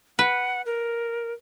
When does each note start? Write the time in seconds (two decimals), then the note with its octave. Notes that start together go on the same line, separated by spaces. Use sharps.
0.19 B4 F#5
0.66 A#4